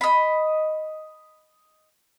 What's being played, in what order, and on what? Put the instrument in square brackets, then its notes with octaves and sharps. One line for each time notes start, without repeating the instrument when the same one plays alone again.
[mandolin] D#5 B5